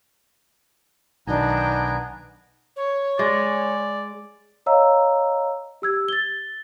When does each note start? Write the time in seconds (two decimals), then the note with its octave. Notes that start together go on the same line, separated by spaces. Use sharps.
1.27 B1 D#3 B3 D4 D#4 G#5 A#5
2.76 C#5
3.19 G#3 D5
4.66 C#5 D#5 F5 A#5 E6
5.82 G4 E6 G#6
6.08 A6 G7